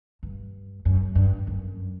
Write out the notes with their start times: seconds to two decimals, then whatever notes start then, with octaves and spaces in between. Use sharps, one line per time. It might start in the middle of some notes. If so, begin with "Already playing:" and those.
0.23 G2
0.85 F#2
1.15 G2
1.47 F#2